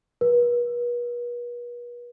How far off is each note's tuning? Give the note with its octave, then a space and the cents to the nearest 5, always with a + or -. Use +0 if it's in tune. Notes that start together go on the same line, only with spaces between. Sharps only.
B4 -40